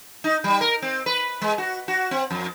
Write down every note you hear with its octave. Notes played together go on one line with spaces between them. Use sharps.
D#4
G3
A#4
C4
B4
G#3
F#4
F#4
C4
F2